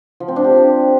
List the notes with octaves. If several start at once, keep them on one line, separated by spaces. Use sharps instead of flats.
F3
C4
D4
G4